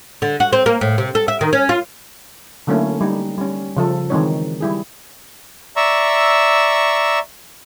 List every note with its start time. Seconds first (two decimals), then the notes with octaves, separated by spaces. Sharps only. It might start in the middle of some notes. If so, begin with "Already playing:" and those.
0.22 D3
0.40 F#4
0.53 C4
0.66 A#3
0.81 A2
0.98 C3
1.15 A4
1.28 E5
1.41 D#3
1.53 C#4
1.69 F4
2.67 D3 F#3 A3 A#3 C#4 E4
3.01 G3 D#4
3.38 G3 C#4
3.77 C#3 F3 A4
4.10 D#3 E3 G#3 C4 D#4 C#5
4.61 G3 E4 G#4
5.76 D5 E5 A#5 C#6 E6